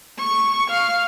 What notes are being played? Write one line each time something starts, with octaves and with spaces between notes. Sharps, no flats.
C#6
F5